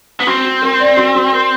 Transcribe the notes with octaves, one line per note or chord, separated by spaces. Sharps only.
B3
C4 F#4
F#4
A#4
D5
F#4
F#4
A#4